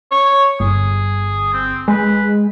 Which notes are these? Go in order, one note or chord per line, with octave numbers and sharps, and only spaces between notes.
C#5
G1 G#4
C4
G#3 B4